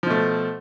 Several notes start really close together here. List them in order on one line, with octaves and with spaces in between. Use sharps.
F3 B2 A3